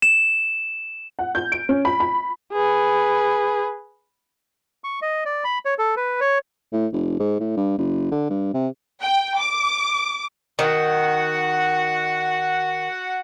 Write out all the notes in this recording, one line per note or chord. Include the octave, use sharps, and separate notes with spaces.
E7
F#5
G6
D7
C#4
B5
B5
G#4 B4
C#6
D#5
D5
B5
C#5
A4
B4
C#5
A2
F1
G#2
A2
G2
F#1
D3
G2
C3
G5
D6
D#3 F#4 F#5